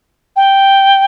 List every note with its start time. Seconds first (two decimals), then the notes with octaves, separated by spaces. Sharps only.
0.36 G5